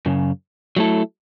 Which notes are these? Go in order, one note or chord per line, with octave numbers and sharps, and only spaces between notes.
F#2 C#3
F#3 A3 E4 A4